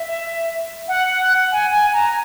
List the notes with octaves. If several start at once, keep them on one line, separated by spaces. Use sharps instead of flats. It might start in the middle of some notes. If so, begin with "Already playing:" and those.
Already playing: E5
F#5
G#5
G#5
A#5